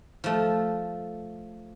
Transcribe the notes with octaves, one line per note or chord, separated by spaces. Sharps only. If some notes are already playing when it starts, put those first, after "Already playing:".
F3 A3